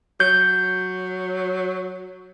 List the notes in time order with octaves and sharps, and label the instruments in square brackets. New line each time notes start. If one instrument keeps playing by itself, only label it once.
[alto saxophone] F#3 [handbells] G6